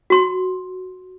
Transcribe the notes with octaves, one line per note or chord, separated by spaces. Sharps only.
F#4 C6